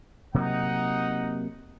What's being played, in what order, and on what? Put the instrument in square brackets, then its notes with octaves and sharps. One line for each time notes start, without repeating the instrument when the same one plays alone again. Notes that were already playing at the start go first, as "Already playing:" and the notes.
[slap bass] C3 F#3 A#3 [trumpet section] D#4 F#5